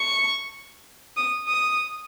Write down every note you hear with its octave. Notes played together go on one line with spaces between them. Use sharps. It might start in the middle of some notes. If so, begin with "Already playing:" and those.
Already playing: C#6
D#6
D#6